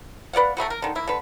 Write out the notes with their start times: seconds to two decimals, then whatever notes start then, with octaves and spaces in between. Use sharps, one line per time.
0.33 B4 D5 F5 F#5
0.57 F#3 A3 B3 F#4
0.70 A#4
0.82 D3 D#3
0.95 A#3 E4
1.07 D3 B4